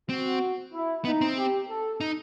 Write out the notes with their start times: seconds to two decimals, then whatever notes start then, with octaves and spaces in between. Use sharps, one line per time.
0.09 C4 F#4
0.73 E4
1.05 B3 D#4
1.21 C4
1.37 G4
1.68 A4
2.01 D#4